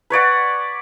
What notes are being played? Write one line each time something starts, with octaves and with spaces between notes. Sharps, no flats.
B4 C#5 D5 F#5